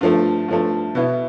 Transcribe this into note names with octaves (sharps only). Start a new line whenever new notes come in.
G2 F3 A3
G2 F3 A3
B2 B3 E4